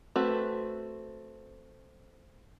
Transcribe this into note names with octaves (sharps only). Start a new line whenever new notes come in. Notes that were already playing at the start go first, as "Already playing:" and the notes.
A3 C4 F#4 B4